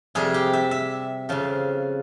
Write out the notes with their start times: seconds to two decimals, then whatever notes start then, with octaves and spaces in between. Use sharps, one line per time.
0.15 F2 C3 G3 G#4
0.34 G4
0.53 E5
0.71 E5
1.29 F2 C#3 F3